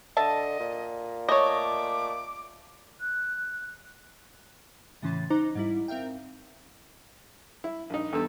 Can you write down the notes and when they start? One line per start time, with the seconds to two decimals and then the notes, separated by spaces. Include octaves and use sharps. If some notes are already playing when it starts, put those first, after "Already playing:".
0.17 D3 D#5 E5 A5
0.60 A#2
1.29 A3 C#5 D#5 D6
3.00 F#6
5.02 A2 C#3 E3 C#4 C6 A6
5.30 D#4 C5 A#5 D6 F#6
5.55 G#2 G3 E4
5.88 C4 A#4 E5 F5 G5
7.64 E4
7.90 A#1 D#4
8.13 E2 G2 A4